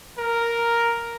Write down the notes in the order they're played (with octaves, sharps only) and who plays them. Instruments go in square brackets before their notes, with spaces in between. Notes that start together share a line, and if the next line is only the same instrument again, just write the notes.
[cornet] A#4